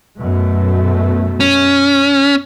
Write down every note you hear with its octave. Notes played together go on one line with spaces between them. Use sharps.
F#2 B2 A3
C#4